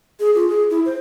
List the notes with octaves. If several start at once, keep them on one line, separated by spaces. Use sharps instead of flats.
G#4
F4
G#4
E4
C5